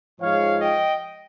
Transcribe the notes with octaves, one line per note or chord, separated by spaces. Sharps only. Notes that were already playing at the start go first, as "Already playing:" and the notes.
G#2 F3 G#3 C#5 F5
D#5 G5